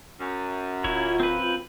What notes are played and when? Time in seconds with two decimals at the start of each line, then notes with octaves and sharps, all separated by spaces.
0.19 F#2
0.84 D1 E4 F4 C#5
1.20 C4 B4